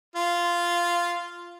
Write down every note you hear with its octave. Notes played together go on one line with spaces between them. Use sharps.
F4